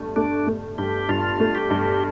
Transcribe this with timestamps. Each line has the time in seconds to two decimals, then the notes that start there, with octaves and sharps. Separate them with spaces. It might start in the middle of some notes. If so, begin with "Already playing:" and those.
Already playing: G2 A3
0.16 A3 D4
0.47 A3
0.78 G2 G4
1.09 G2 F4
1.40 A3
1.55 G4
1.70 G2